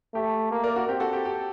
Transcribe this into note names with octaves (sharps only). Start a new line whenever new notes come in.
A3 G4
A#3
A#4 D5
F#4
C4 G4
F#4 A4
G4
G4